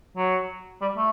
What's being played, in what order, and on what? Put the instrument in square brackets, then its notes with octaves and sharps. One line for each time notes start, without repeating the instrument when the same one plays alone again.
[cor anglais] F#3
G3
A3